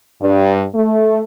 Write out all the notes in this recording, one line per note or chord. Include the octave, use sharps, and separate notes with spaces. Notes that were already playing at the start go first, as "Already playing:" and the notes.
G2
A3